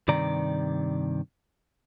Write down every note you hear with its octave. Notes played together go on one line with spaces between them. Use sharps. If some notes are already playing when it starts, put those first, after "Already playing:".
G2 C3 D#3 D5 A#5